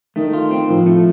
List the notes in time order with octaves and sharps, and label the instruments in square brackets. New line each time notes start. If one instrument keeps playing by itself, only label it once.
[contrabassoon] D#3 [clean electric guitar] A3
[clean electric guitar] F4
C4
[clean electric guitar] A2 [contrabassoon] F3
[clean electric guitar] A3